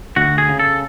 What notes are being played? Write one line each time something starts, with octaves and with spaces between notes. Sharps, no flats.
D2 F#4
G#4
C#3
A4